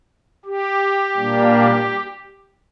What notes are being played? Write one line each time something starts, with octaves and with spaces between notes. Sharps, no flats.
G4
A#2 G3 A#3 D4